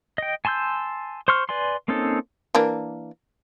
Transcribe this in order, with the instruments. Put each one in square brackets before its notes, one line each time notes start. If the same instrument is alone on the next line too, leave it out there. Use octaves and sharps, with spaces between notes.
[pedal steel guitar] D#5 G5
G#5 A5 C6 E6 G6
C5 C6 C#6 F6
B4 D5 G#5 C6
A#3 C4 C#4 D#4 A4
[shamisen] E3 A#3 D4